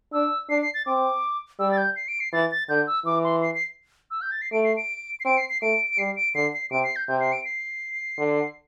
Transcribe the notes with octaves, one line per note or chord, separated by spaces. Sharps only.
D4 E6
D4 C7
C7
A6
C4 D6
G3 E6
A6
G6
C7
D7
C7
E3 A6
A6
D3 G6
E6
E3 D6
C6
C7
C7
E6
G6
A6
C7
A3 D7
C7
D7
C7
C4 D7
C7
C7
A3 D7
D7
G3 C7
D7
D3 C7
C7
C3 D7
C7
G6
C3 G6
C7
D7
C7
D3